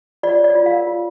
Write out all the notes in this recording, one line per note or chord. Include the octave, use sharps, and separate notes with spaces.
F4 D5
C#5
D5
F4
F5
A#4
F4